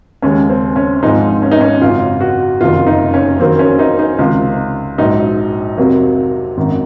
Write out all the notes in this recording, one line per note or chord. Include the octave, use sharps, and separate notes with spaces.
D#2 C#3 G#3 C#4
C4
C#4
G#1 G#2 F3 G#3 D#4
C#4
D#4
C#4
G#1 F#2 C#3 F4
F#4
F#1 F2 C3 D#3 A#3 F4
D#4
C#4
F2 D#3 F#3 A#3 C4
C#4
D#4
D#4
C#2 C3 D#3 F4
A#1 G#2 F#3 D#4
F2 C3 F#3 A#3
G#1 F#2 D#3